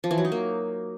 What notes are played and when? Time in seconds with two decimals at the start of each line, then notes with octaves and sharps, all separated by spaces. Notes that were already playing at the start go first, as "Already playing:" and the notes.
0.04 F3
0.11 E3
0.18 F#3
0.25 D#4
0.32 A#3